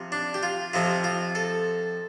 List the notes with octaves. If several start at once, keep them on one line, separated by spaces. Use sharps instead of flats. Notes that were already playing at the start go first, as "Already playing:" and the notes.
Already playing: C3 F3
D4
G4
F4
F2 C3 F3 C4 F4
F4
A4